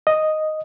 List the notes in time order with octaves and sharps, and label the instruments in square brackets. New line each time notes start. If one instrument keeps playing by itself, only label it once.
[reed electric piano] D#5